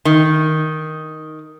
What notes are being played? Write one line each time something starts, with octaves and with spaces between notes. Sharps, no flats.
D#3